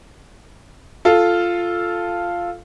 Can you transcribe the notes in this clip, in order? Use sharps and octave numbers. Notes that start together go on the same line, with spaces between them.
F4 A4 F5